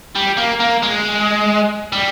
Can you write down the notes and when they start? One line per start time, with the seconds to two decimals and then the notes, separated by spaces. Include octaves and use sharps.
0.15 G3
0.37 A#3
0.60 A#3
0.82 G#3
1.92 G3